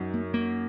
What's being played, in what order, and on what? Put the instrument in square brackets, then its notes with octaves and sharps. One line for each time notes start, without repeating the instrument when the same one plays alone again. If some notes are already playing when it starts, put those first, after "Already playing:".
Already playing: [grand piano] F#2 F#3 D#4 F#4
[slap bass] A#3
A#3